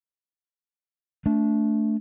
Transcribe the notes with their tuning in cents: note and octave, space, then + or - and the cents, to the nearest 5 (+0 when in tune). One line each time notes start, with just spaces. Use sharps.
A3 +0 D4 -20